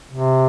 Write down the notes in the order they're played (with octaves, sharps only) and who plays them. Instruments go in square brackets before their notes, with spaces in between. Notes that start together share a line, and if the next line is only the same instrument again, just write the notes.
[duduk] C3